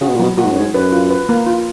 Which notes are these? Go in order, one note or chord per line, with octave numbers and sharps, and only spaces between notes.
C#3 F#4
B2
A#2
B2 F#3
A#2 F#4
G#2
F#2
G#2 C#5
F#2 B4
F4
B4
A#3
F4